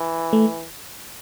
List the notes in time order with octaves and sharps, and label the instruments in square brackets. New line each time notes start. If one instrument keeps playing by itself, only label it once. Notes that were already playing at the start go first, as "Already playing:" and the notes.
Already playing: [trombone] E3
[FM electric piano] A3